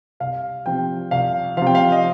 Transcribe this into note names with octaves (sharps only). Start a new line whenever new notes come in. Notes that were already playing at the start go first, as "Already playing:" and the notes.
C2 F5
C3 F3 G5
C2 F5
C3 F3 F5
G5
F5
D#5